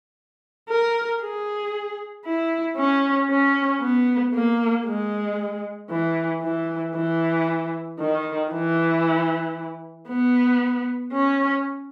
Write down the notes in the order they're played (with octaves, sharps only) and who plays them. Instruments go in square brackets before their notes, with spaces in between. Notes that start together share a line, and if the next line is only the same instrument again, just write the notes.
[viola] A#4
G#4
E4
C#4
C#4
B3
A#3
G#3
E3
E3
E3
D#3
E3
B3
C#4